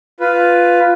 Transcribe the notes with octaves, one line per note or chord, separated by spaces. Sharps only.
F4 B4